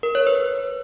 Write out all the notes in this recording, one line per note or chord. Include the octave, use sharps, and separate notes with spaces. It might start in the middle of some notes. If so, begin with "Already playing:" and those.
A#4
C#5
B4